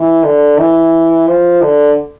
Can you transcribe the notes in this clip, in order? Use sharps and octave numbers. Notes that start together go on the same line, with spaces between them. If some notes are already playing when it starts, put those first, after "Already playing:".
Already playing: E3
D3
E3
F3
D3